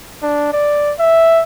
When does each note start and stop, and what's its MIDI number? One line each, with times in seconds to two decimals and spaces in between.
0.23 0.51 62
0.53 0.93 74
0.99 1.43 76